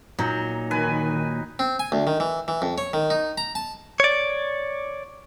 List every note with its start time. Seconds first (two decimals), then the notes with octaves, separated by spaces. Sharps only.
0.19 A#2 F#3 D#4
0.71 D#3 B4 G#5
1.59 C4
1.79 G#5
1.92 D2
2.07 D#3
2.20 E3
2.48 E3
2.62 F2
2.78 C#5
2.93 D#3
3.10 D#4
3.38 A#5
3.55 A5
4.00 C#5 D5